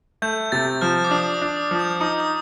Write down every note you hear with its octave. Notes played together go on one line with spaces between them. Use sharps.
A3 G6
C3 A6
F3 F6
D6
D4 D#6
D6
D4
D#6
F3
G6
D#4 D#6
D#6